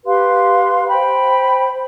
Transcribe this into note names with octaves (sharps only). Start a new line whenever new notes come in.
G4 B4 F5 C6
C5 G5 B5
C5